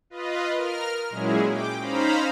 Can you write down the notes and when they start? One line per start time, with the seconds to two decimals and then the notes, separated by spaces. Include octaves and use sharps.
0.10 F4 B4 D#5
0.54 A#4 F6
1.10 A#2 F#3 G#3 C#4 E4 G#4
1.49 G5 D6
1.80 C#4 D#4 C5 F5 A#5 B5